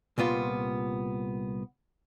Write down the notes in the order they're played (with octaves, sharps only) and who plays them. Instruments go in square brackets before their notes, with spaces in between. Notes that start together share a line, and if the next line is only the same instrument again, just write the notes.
[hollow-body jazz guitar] C2 A#2 B3 F4